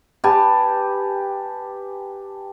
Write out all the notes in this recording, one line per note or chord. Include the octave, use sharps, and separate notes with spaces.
G4 B4 G#5 A5